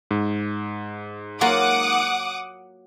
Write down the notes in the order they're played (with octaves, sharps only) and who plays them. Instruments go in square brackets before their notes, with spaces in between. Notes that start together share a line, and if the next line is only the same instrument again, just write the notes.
[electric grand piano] G#2
[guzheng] F#3 A#3 F4 [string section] F#5 D6 D#6